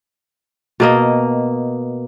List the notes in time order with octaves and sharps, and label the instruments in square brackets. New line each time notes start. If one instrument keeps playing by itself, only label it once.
[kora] B2 A#3 D#5